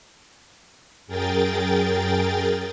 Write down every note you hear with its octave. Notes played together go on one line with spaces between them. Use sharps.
F#2 G#4 A#4 G5 A6